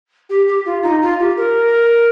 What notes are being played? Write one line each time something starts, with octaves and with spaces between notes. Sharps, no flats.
G4
G4
F4
D#4
F4
G4
A#4